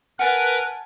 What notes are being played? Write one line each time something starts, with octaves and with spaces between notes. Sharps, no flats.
A#4 B4 F#5 G#5 A5